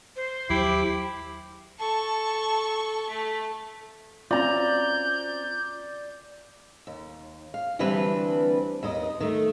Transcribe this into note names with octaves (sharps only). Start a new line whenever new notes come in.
C5
D#2 F#3 E4 G4 D6
A4 A5 C#6
A3 B6
C4 C#4 F4 D5 A#5 G6
D#2
F5
D2 E3 G3 C4 D4 B4
D#2 D#3 D#5
D#3 A3